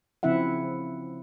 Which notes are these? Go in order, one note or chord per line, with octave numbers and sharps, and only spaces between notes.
C#3 F3 C4 E4 E5 F#5